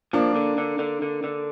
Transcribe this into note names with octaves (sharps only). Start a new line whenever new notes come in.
F3 A#3 D4
D3
D3
D3
D3
D3